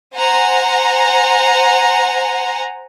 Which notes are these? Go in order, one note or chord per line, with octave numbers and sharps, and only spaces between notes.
C5 F#5 G#5 A#5